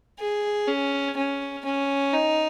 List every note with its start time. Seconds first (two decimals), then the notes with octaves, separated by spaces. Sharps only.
0.19 G#4
0.68 C#4
1.17 C#4
1.65 C#4
2.13 D#4